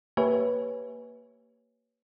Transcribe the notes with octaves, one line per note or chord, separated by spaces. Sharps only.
A#3 G4 B4 C#5 E5 G#5